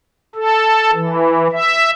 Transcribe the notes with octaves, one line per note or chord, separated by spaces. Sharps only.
A4
E3
E5